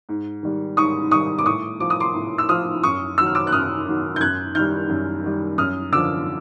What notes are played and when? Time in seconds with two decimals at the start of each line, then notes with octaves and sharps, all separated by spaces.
0.09 G#2
0.43 D#3 G3
0.77 G#2 C#6 D#6
1.11 D#3 G3 C#6 D#6
1.39 D6
1.46 A2 C#6 D#6
1.80 F3 D6
1.90 D#6
2.00 C6 D6
2.15 A2
2.38 E6
2.49 F3 D#6 F6
2.83 F#2 C#6 D#6
3.18 D#3 F#3 E6
3.26 F6
3.35 D6 E6
3.47 F#6
3.52 F#2 D#6 F6
3.87 D#3 F#3
4.16 G6
4.21 F#2 F#6 G#6
4.55 D#3 G3 F6 G6
4.89 F#2
5.24 D#3 G3
5.58 F#2 D#6 F6
5.92 D3 F3 D6 E6